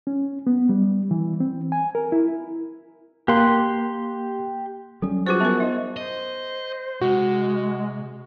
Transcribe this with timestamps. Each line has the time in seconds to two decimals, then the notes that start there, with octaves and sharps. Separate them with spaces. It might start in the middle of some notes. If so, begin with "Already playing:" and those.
0.07 C#4
0.47 B3
0.69 G3
1.11 E3
1.40 C4
1.72 G#5
1.95 A#4
2.12 E4
3.28 A#3 G4 C6 F#6
5.02 F#3 G3 C#4 A4
5.27 D#4 F4 F#4 G#4 B4 C5 D6
5.40 B3 A#4 E5 F#5 G#5
5.60 D#4 A#4 D#5 E5
5.97 C5 D#5
7.01 C3 G#3 F#4